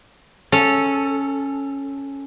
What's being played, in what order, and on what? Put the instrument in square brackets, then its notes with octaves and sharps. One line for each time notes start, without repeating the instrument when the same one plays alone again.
[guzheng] C#4 A4